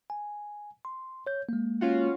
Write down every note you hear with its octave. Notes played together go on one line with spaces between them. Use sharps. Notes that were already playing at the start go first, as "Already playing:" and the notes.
G#5
C6
C#5 G6
G#3 A#3
C#4 F4 F#4